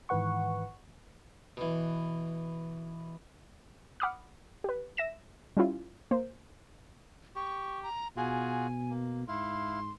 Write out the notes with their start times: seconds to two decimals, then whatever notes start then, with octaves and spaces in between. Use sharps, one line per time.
0.09 G#2 D#3 E3 B4 F#5 C#6
1.57 B2 E3
4.00 F#5 B5 D6 D#6 F6
4.64 G4 B4
4.97 E5 A#6 E7
5.57 G3 C#4 E4 F4
6.11 A#3 C5
7.36 G4 C#6
7.83 A#5
8.17 B2 F4 F#4 G#4 G#5
8.90 A#3
9.28 G#2 E4 F5 C6